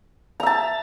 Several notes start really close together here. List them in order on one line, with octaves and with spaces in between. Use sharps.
A#5 E5 A5